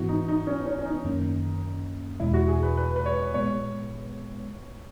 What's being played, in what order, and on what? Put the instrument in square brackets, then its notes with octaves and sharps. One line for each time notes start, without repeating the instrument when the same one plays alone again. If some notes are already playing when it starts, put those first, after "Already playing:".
Already playing: [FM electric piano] G#2 E3 B3 E4 [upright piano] F#4
[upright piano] D#4
D#4
C#4
C#4
C#4
D#4
[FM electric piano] F#2 D#3 A#3 C#4
[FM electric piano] E2 B2 G#3 [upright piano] E4
[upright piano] F#4
G#4
B4
B4
B4
C#5
[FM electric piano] A#2 G#3 B3 [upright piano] C#5